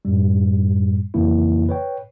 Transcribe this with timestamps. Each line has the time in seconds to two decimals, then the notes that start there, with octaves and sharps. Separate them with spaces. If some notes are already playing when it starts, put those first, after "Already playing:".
0.05 F#2 A2 G3
1.14 F2 C#3 E3 A#3 E4
1.69 B4 C#5 G5